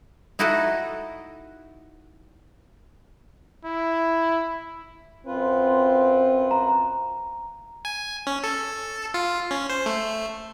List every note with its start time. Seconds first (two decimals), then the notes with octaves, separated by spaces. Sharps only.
0.39 D#4 E4 F#4 A4 D#5 A#5
3.65 E4
5.26 F#2 C4 F4 B4
6.51 A#5
7.85 G#5
8.27 C#4
8.44 A4
9.14 F4
9.51 C#4
9.69 C5
9.86 A3